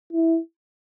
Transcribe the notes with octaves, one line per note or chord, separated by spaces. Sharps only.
E4